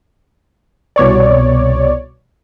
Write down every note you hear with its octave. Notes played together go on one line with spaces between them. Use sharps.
C2 B2 C#5 D5